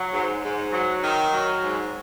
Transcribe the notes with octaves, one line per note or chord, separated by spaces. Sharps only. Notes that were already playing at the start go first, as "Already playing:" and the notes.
Already playing: F#3
G#2
G#2
F#3
D#3
F#3
G#2